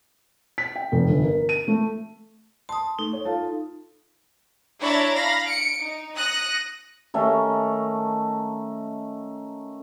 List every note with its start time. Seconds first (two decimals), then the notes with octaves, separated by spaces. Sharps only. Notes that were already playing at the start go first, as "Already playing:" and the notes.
0.58 B6
0.76 G5
0.92 F1
1.09 G1
1.24 A#4
1.49 D#7
1.68 A3
2.69 A5 C6 D#6
2.99 A3 D#4
3.13 C#5
3.25 F4 A4 A5
4.81 D4 E4 C#5 A#5 B5 A6
5.13 F5 B5 A#6
5.46 C#7 D7
5.81 D#4
6.15 D#6 F#6 A#6 C#7
7.14 D#3 A3 C#4